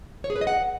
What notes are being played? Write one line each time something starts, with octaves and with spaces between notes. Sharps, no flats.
C#5
G#4
B4
D#5
F#5